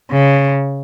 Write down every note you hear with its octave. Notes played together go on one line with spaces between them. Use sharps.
C#3